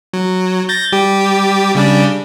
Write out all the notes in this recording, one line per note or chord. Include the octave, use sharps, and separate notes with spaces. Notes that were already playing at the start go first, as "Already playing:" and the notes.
F#3
G6 A6 A#6
G3 G4
C#3 G3 D4